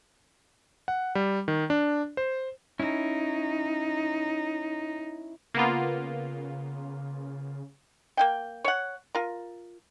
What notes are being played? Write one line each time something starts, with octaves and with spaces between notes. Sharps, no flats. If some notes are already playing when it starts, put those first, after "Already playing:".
F#5
G3
D#3
D4
C5
C#4 D#4 E4
C#3 A#3 B3 F4
A#3 D#4 G5
C#5 F#5
F4 A#4